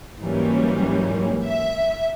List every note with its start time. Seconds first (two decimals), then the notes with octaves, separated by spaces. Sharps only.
0.20 G#2 E3 F#3 G3 A#3 C#4
1.44 E5